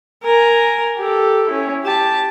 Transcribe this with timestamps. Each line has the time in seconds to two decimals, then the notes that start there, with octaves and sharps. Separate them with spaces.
0.24 A#4 G#5
0.97 G4 A4
1.48 C#4 E4
1.84 G4 A5